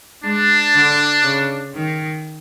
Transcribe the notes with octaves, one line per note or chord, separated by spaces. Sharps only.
G#3 D4
D3
C#3
D#3